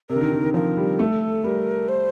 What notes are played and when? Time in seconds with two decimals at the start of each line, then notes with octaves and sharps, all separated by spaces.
0.10 C3 A#4
0.16 D3
0.21 D#3
0.32 D#3
0.43 D#3
0.54 F3 A#4
0.77 G3
0.99 A3 A4
1.44 G3 A#4
1.89 C5